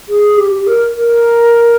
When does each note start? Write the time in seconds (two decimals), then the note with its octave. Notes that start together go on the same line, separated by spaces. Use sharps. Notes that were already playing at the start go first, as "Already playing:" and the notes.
0.08 G#4
0.37 G4
0.52 G4
0.67 A#4
0.96 A#4